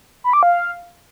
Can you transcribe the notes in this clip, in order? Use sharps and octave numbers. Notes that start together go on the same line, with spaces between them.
B5
D6
F5